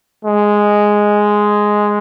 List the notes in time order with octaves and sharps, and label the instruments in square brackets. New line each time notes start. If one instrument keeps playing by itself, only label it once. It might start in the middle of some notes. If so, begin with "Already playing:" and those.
[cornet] G#3